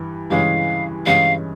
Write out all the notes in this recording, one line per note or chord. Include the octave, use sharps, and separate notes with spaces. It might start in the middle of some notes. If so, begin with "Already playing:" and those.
Already playing: G2 E3
G2 E3 G#3 C#4 F5
G2 E3 G#3 C#4 F5